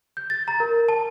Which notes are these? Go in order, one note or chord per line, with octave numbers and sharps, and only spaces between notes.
G6
A6
A#5
A#4
A5